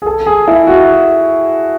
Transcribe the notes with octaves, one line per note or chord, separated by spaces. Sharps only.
G#4
A4
G#4
E4
F#4